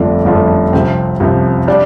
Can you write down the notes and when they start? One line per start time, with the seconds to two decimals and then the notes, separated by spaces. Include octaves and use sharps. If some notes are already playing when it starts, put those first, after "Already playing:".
Already playing: G1 F2 F3 A3 D4
0.25 G1 F2 F3 A3 D4
0.73 C2 C3 F3 C4
1.20 C2 C3 F3 C4
1.68 G3 D4